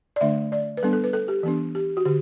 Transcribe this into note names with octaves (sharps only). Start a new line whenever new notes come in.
D5
D3 A3 D4 E5
D5
B4
G3 B3 D4 A4
A4
B4
A4
G4
E3 B3 D4
G4
F#4
D3 G4